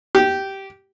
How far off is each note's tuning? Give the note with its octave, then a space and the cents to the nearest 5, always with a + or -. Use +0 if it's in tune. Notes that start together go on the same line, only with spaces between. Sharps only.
G4 -10